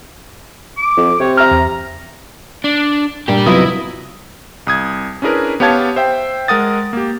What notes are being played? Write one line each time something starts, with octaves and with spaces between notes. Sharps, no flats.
D6
F2
C3 C#5
E5 A#5 F6
E2
D4
A#2 G3 D4 G4
C3 F#3 B3 E4 F4 B4 D#5
C2 D#6 G#6
C#4 D4 E4 G#4 A#4 B4
B3 G4 C#5 F5 A5 G#6
C5 E5 G5
G#3 A#4 F#5 D#6 A6
A#3 G4